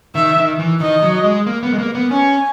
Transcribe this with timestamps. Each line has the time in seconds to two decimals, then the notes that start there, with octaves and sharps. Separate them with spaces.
0.15 D#3 E5
0.37 D#3
0.59 E3
0.80 D#3 D#5
1.02 F#3
1.24 G#3
1.46 A#3
1.63 B3
1.73 G#3
1.78 A#3
1.95 B3
2.11 C#4 G#5